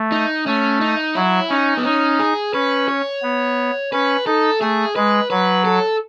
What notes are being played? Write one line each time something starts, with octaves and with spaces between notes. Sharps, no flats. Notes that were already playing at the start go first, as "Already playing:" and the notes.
Already playing: A3
D#4
A3 C#4
D#4
F#3 E4
C#4 D#4
B3
C#4 D#4
G#4
C#4 B4
C#5
B3
C#4 B4
D#4 A4
A3 G#4
G#3 B4
F#3 B4
A4